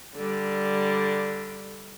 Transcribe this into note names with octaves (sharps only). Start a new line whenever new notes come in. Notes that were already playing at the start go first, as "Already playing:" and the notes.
D3 G3